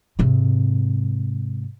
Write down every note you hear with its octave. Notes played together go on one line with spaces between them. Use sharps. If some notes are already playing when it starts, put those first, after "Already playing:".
G#2 C3